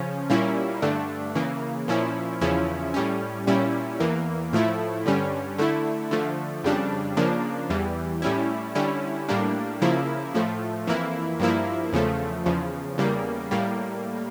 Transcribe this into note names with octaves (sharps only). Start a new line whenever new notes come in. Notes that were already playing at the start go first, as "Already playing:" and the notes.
Already playing: C#3 F3 C#4
A#2 G3 A#3 C#4 E4
G2 D3 A3 D4
C#3 E3 A#3
A#2 F3 C#4 E4
E2 C#3 F3 C#4 E4
A2 G3 C#4
A#2 G3 C#4 E4
E2 E3 A#3
A2 F3 A3 E4
G2 D3 G3 C#4
D3 A3 E4
D3 F3 A3
F2 C#3 G3 D4
C#3 F3 A#3 D4
E2 E3 G3
A2 G3 C#4 E4
D3 G3 C#4 E4
A2 G3 A#3 D4
C#3 F3 A#3 E4
A2 F3 A3
F2 E3 A#3 E4
G2 F3 A#3 E4
E2 C#3 F3 A3
E2 C#3 F3
E2 C#3 G3 A#3
A2 G3 A#3